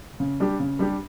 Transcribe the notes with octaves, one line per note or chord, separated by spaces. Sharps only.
C#3
G3 D4 G4
C#3
G3 D4 G4